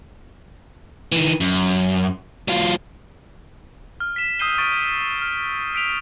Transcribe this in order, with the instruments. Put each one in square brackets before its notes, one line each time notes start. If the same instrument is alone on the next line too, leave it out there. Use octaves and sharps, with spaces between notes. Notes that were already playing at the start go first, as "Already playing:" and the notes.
[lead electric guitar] D#3 E3
F#2
F#3 F4
[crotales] F6
B6 E7
D#6 E6 G6 C7 D#7 G7
C#6 A6 D7 D#7
F6
E6 B6 D7 D#7 F7